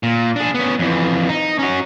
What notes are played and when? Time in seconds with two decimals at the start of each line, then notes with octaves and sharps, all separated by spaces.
0.03 A#2
0.36 D4 G#4
0.54 B3 C#4
0.79 F2 E3
1.29 D#4
1.59 C#4 F#4